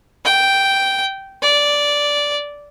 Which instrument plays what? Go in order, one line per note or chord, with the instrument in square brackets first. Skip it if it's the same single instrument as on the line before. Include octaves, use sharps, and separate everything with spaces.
[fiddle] G5
D5